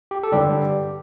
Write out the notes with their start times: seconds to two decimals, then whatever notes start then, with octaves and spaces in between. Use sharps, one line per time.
0.11 G4
0.23 A4
0.32 G2 D3 G3 D4 G4